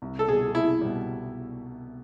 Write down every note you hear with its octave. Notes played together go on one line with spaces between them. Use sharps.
C2
A4
B2 G3 G#4
C2 E4
B2 G3